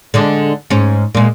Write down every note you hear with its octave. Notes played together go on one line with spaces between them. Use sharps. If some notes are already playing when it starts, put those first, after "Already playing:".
D3 G#3 D4
G#2 C#4
A#2 G#3